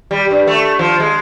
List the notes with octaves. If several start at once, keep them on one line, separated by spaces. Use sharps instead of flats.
G3
G2
A3
F3
G#3